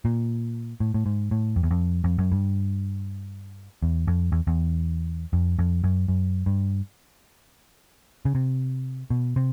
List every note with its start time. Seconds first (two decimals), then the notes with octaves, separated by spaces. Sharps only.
0.05 A#2
0.80 A2
0.94 A2
1.06 G#2
1.31 A2
1.56 F2
1.63 E2
1.71 F2
2.04 F2
2.18 F#2
2.32 G2
3.83 E2
4.08 F2
4.32 E2
4.47 E2
5.33 F2
5.59 F2
5.84 F#2
6.08 F#2
6.46 G2
8.25 C#3
8.35 C3
9.10 B2
9.36 C3